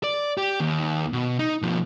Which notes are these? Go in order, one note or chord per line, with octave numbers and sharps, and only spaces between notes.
D5
G4
D#2
B2
D#4
B2 F3